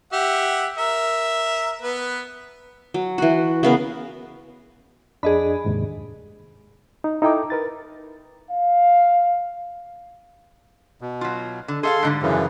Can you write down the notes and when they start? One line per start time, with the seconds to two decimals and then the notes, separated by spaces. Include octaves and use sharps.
0.13 G4 E5 F#5
0.78 A#4 E5
1.82 B3 B4
2.94 F#3
3.18 E3 F#4
3.63 C#3 B3 A#4
5.23 F2 D4 G#4 D#5 B5
5.64 D#2 G#2 C3
7.04 D#4
7.22 D#4 E4 A4 G5 A#5 D6
7.50 A#4 B4 A6
8.51 F5
11.01 B2
11.21 F#3 F4
11.68 D3
11.83 G#4 A4 E5 F5 C6
12.03 G#2 D3 G3
12.22 F#2 C#3 E3